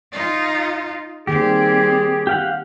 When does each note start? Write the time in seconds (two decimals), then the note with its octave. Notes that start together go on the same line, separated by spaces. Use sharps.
0.12 D#4 F4
1.27 D#3 G3 A#3 C4 G4 G#4
2.27 G4 F5 F#5